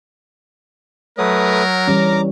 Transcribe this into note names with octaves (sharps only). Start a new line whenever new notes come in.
F#3 A3 A#4 B4 D#6
E3 G3 C#4 A#5 D6